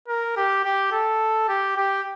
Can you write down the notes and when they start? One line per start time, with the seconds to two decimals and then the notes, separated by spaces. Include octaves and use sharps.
0.08 A#4
0.37 G4
0.64 G4
0.92 A4
1.49 G4
1.77 G4